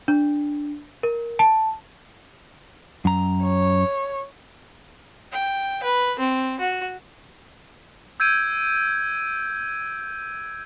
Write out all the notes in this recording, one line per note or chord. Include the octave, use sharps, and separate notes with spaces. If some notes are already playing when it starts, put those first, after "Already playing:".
D4
A#4
A5
F#2 A#5
C#5
G5
B4
C4
F#4
E6 G6 G#6 D7 D#7